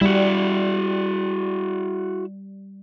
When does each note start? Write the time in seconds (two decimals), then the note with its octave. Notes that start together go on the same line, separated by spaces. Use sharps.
0.01 G3 E4 F#4